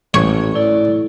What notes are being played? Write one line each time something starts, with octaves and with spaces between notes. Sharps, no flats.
A1 C#5
A2 E4 D5